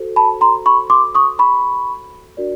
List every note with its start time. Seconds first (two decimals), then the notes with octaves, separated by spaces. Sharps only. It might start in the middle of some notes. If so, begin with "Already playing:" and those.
Already playing: F#4 A4 C5
0.16 A5 B5
0.41 A#5 C6
0.66 B5 C#6
0.90 C6 D6
1.15 C#6 D#6
1.39 B5 C#6
2.37 D4 F#4 A#4 D5